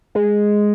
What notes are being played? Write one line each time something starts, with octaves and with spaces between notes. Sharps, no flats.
G#3